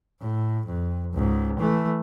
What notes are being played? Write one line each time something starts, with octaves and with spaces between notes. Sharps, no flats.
A2
F2
C#2 G#2
E3 A3